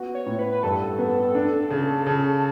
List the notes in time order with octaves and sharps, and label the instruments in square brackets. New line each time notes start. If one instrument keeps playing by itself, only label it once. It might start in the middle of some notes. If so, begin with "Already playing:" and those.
Already playing: [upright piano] B3 F#4
[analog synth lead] C#5
[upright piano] A2
[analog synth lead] B4
B4
[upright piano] G2 [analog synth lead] A4
[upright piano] B3
D4
C#3
C#3